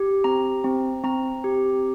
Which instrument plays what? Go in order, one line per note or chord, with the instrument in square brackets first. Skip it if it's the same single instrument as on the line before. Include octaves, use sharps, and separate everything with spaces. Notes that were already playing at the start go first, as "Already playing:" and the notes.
Already playing: [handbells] G4
C4 A#5
C4
C4 A#5
G4